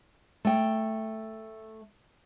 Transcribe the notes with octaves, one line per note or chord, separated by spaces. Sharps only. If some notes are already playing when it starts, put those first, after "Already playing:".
A3 G5